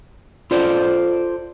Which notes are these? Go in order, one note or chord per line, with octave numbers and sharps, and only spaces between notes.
F4 A4 C5 D5